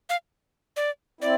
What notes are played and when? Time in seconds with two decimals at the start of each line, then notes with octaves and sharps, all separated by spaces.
0.09 F5
0.76 D5
1.21 C4 E4 D5